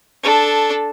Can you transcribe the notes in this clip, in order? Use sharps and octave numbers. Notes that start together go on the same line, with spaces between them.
D4 A4